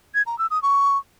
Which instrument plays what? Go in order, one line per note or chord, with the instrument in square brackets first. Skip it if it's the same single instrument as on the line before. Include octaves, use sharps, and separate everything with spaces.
[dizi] G#6
A#5
E6
D#6
C#6